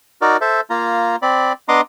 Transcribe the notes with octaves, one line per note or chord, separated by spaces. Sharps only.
D#4 F#4 A#4 D5
A4 C5 E5
A#3 F4 A#5
C4 D5 B5
B3 D4 D#5 A#5 C6 D6